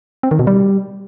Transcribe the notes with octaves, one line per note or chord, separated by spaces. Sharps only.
C4
D#3
B2
G3